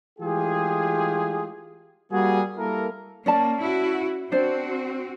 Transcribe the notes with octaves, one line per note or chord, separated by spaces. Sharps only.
E3 G#3 A3 F4 G4 G#4
G3 A#3 F#4 G#4
G3 A#3 E4 A4 A#4
A#3 C#4 D5 A5
E4 F#4
C4 D4 F#4 C5